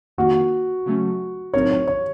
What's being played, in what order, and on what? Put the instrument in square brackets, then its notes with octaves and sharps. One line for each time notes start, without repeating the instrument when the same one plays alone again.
[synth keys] F2 D#3 A#3 [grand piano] F#4
[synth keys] C#3 F#3 A3 C#4
[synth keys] A2 F#3 C4 D#4 A#4 [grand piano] C#5
[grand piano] C#5
C#5